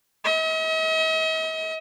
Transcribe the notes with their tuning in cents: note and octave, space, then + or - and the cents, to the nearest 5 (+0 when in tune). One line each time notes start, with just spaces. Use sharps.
D#5 +45